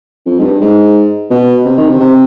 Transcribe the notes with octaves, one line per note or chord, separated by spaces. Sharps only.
F2
G#2
G2
G#2
B2
C3
D#3
C3
C3